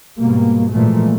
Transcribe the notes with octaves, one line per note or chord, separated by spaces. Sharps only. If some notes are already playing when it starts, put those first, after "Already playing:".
G#2 B2 G3 A#3
A#2 E3 F3 G#3 A3